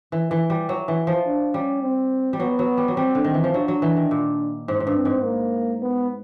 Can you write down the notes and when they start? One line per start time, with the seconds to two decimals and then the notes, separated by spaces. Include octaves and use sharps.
0.12 E3
0.31 E3
0.50 G3
0.69 F#3
0.88 E3
1.07 F3
1.26 D4
1.54 G3 C#4
1.82 C4
2.33 G3
2.40 F#3 B3
2.59 F#3
2.77 G3
2.88 F#3
2.97 G3 C4
3.15 D3
3.24 D#3 C4
3.34 E3
3.44 F3
3.53 F#3 D4
3.68 F#3
3.82 E3
3.96 D#3
4.11 A#2
4.68 G#2
4.80 G#2
4.87 G2
4.96 C4
5.05 G#2
5.24 A#3
5.82 B3